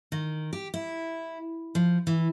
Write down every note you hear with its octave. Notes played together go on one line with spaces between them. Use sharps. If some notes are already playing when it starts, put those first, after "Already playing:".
D#3
G4
E4
F3
E3